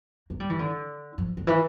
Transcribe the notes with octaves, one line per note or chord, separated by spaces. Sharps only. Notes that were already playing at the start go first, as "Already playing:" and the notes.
A#3
G3
E3
D3
F3
D3
E3